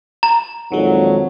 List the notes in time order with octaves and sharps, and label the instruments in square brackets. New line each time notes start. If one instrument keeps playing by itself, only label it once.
[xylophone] A#5
[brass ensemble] A#1 F2 [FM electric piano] D#3 G#3 [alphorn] F#3